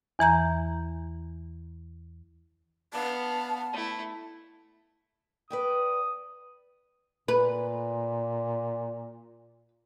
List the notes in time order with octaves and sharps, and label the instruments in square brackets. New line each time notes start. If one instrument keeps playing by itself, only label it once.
[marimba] E2 E3 A#5 G6
[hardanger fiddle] B3 F5 [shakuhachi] A5
[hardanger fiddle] A3 E4
[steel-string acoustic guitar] B4 D5 G5 [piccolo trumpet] D#6
[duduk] A#2 [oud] B4